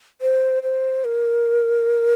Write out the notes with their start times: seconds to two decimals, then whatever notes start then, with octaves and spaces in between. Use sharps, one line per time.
0.21 C5
0.63 C5
1.04 A#4